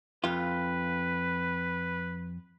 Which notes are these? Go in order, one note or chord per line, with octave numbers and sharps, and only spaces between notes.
F2 F4 B4